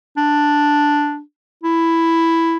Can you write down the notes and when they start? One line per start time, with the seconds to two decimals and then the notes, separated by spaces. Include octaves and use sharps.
0.17 D4
1.64 E4